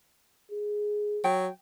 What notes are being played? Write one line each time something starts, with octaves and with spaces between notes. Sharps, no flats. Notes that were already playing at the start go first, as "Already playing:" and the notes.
G#4
F#3 G5